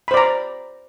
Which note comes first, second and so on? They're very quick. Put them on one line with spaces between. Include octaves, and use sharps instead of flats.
B5 C5 D5 A#5